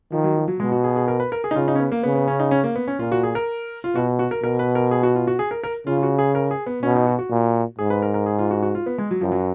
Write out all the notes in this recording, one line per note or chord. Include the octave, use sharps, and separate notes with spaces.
D#3 F3
F#3
F3
F#3
B2 G#3
F#4
G#4
G#4
A#4
B4
A#4
G#4
D#4
C#3 F4
D#4
C#4
B3
A#3
C#3 B3
B3
C#4
D#4
C#4
A#3
B3
C#4
A#2 F4
F#4
G#4
A#4
F4
B2 F#4
F#4
A#4
B2 A#4
B4
A#4
G#4
F#4
F4
F#4
G#4
A#4
A#4
C#3 F4
F4
F#4
G#4
A#4
G#4
B3
B2 C#4
D#4
F#4
F#4
A#2
G#2 G#4
B4
A#4
A#4
G#4
F4
F#4
F#4
F4
B3
G#3
F#3
F#2 F3
F#3